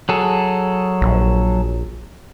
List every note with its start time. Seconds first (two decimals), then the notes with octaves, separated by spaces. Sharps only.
0.09 F#3 G#4 A4
1.01 A#1